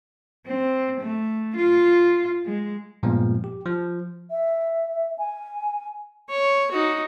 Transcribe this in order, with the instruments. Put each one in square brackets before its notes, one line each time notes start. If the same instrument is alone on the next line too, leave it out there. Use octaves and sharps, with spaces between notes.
[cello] C4
A3
F4
G#3
[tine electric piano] G2 A#2 F3 G#3 B3
G4
F3
[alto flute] E5
G#5
[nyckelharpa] C#5
D#4 F#4